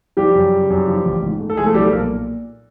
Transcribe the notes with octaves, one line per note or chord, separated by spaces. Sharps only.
F3 G3 G4
F#2
C#3
F#2
F3
A1
G#2
A3
A4
F3 G#3 G#4
A3 A4
B1 G3 G4
A3 A4
A#2 A#3 A#4